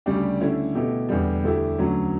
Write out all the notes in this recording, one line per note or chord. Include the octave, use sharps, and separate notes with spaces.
D2 C#3 G3 D4 G4
D3 A3 C#4 E4
B2 A3 E4 G4
E2 D3 G3
D2 D3 A3 E4 G4
D2 D3 F#3 A3 C#4